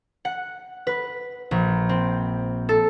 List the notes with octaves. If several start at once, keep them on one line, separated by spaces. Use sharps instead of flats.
F#5
B4
A#1
C4
A4